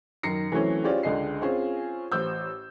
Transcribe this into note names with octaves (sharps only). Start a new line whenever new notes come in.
F#2 D#3 A#4 A#6 C7 C#7
E3 F#3 A3 C4 C#4
C#4 F4 G4 G#4 C5 D5
C#2 D3 G#4 D#5 C7
C4 C#4 F4 G#4
A1 C5 E6 G6